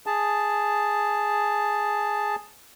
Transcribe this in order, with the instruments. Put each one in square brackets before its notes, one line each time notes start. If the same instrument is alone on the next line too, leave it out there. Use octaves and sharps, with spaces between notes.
[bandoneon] G#4 A5